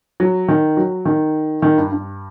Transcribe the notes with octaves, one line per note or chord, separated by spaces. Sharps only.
F#3
D#3
F#3
D#3
D#3
G2
G2